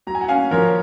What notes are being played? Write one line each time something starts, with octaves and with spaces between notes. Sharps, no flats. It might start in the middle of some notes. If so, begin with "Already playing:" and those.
F#3 A#5
G#5
F#5
C#4 F5 G#5
F3 A#4 C#5